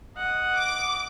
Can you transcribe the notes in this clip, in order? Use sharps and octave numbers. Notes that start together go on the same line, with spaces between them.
D#5 F#5
D6